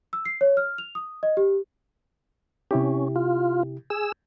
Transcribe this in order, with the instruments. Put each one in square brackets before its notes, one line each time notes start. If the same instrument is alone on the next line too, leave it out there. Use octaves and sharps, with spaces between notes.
[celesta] E6
C7
C#5
F6
F7
D#6
D#5
G4
[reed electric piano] C3 E4 G4 [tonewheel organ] C#4
[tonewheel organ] F4
G#4 E6